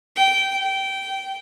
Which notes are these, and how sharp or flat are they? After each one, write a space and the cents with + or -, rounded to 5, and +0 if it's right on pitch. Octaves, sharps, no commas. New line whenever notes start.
G5 -15
G5 -15